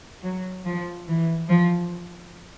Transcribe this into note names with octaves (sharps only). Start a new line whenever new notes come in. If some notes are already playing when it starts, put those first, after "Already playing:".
F#3
F3
E3
F3